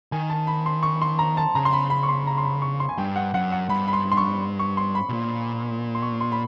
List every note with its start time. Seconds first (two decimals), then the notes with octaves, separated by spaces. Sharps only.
0.12 D#3 G#5
0.30 A5
0.47 B5
0.66 C6
0.83 C#6
1.02 C6
1.19 A#5
1.37 A5
1.55 C#3 A#5
1.65 C6
1.73 B5
1.90 B5
2.03 C#6
2.09 C6
2.27 A#5
2.38 C6
2.44 B5
2.62 C#6
2.80 C6
2.89 G#5
2.98 G2 G5
3.16 F#5
3.34 F#2 F#5
3.52 F#5
3.69 G2 B5
3.88 B5
3.93 C6
4.12 C6
4.17 C#6
4.59 C#6
4.77 C6
4.95 B5
5.09 B2
5.13 A#2
5.95 C6
6.02 C#6
6.21 C6
6.32 B5